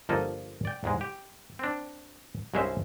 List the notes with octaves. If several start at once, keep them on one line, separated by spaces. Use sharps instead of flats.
G1 F3 A#3 A4 D#5
D5 G5
E2 G#2 G#3
G4
C4 D4
C2 G2 G#3 C#4 C5 E5